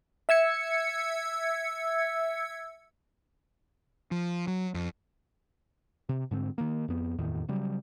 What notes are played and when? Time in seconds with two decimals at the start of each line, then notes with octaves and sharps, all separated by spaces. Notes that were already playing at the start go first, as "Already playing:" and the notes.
0.29 E5 E6 G#6 C#7
4.11 F3
4.48 F#3
4.74 F2
6.09 C3
6.31 G#2 D3 B3 C4
6.58 D#3 A#3
6.88 F2 B3
7.19 F#1 E2 A2 D#3
7.48 C#3 F#3 G3